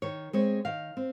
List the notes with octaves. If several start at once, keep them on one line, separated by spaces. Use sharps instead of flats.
D#3 C#5
G#3 C4 C#5
D#3 F5
C4